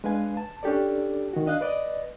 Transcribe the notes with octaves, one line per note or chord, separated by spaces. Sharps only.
G#3 D4 B4 F5 G#5
A5
C#4 D4 G4 A4 D5
D#3 F#4
D4 D#5 F5 F#6
B4 D5 D#5